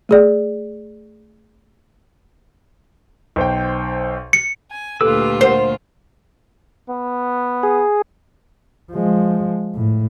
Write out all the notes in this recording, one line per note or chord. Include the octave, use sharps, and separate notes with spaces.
A3 G#4 D5
B1 C5 G5
C#7
G#5
D2 A#2 F4 G4 A4 B4 E6
A#4 C5 F#5
B3
G#4
F3 G#3
A2